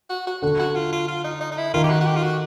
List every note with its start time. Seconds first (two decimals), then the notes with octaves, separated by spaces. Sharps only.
0.10 F#4
0.27 F#4
0.42 D3 F#4
0.59 F#4
0.75 F4
0.92 F4
1.08 F4
1.24 D#4
1.41 D#4
1.51 D#4
1.58 E4
1.74 D#3 F4
1.84 G4
1.90 F#4
2.01 F#4
2.07 G4
2.16 F4
2.23 F#4